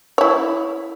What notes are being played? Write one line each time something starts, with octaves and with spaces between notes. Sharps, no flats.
E4 C#5